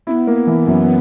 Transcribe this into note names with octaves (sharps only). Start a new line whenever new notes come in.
B3 C#4 E4
A#3
E3
F#2